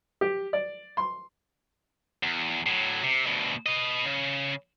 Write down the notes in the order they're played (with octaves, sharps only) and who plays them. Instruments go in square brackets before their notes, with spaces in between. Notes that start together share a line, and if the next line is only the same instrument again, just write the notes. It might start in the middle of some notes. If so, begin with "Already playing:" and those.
[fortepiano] G4
D5
C6
[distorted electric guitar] E2
A2 F#3
C3
D2 B2
B4 D#5
C#3